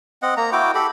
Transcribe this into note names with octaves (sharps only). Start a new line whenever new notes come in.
C4 D#5 F#5
A#3 A#5
E4 F#4 G5 D6
G4 A4 B5